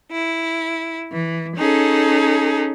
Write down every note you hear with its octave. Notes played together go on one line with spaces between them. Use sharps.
E4
E3
C#4 D#4 G#4 A4